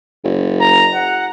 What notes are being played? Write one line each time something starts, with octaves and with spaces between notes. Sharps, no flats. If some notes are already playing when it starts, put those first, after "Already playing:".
F#1
A#5
F#5